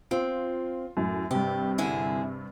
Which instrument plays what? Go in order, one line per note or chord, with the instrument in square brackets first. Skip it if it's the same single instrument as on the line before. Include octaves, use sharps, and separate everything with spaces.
[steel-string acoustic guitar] C4 [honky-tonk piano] F4
[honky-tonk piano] F#2 A2
[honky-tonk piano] G2 C3 [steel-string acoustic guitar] G4
[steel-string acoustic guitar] D3 E4 G#4